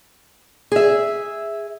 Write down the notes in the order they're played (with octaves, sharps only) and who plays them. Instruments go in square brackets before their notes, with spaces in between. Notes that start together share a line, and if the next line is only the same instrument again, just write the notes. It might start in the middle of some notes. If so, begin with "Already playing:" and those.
[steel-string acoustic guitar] G#4 E5